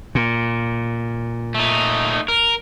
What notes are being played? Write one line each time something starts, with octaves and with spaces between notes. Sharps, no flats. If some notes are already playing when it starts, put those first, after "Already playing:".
A#2
A3 D#4
A#4